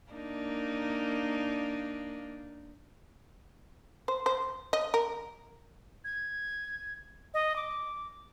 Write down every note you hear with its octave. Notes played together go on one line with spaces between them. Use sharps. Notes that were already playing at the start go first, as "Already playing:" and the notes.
A#3 D4 D#4
C5
C5
D#5
A#4
G#6
D#5
D6